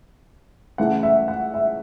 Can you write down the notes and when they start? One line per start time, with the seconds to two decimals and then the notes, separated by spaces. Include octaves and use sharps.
0.78 C#3 E3 A3 F#5
1.03 E5
1.28 F#5
1.54 E5